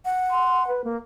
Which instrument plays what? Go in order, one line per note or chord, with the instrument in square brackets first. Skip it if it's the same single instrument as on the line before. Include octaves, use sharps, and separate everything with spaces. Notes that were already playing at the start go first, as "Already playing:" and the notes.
[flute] F#5
[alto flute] C6
B4
A#3